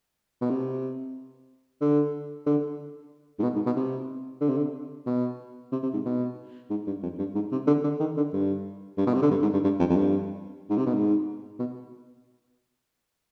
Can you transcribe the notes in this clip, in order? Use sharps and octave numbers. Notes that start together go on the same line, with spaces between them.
B2
C3
D3
D3
G#2
B2
G#2
B2
C3
D3
C3
D3
B2
C3
C3
G#2
B2
G#2
G2
F2
G2
G#2
C3
D3
D3
D#3
D3
G2
G2
B2
C3
D3
G2
G#2
G2
G2
F2
F2
G2
G#2
C3
B2
G#2
B2